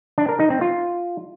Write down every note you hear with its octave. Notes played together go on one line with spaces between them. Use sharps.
D4
A#4
D#4
C4
F4